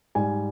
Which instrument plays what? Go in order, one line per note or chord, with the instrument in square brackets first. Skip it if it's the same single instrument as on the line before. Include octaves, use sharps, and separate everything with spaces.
[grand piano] G#2 G3 G#5